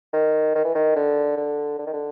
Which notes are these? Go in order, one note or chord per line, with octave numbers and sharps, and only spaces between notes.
D#3
D#3
E3
D#3
D3
D3
D3
D#3
D3